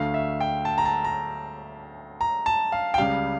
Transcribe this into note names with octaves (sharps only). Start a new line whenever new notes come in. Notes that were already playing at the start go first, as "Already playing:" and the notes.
Already playing: D2 D3 A3 F5
E5
G5
A5
A#5
A5
A#5
A#5
A5
F5
G5
C#2 C#3 G3 F5